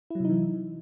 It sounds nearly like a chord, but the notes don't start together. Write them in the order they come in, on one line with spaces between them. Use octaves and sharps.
E4 F#3 C3 D#4 E3